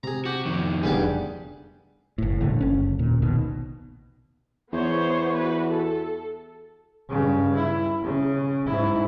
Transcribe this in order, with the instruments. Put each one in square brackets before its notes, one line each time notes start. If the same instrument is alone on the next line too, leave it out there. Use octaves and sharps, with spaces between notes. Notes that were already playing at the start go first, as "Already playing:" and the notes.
[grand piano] C3 [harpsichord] G#4 A#5
[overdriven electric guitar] F#4 [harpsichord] G4
[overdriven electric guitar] F2 D#3
[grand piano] F1 D4 G#4 [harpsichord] G3 B3 G4
[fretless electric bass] F#1 A2
A#1 D3 A3
F#1 C#4
D#2 A#2
A#1 B2 D#3
[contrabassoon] E2 [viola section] B3 C5 C#5
[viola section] F#4 B4
A4
[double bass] G2 C#3
E4
C#3
G#2 E4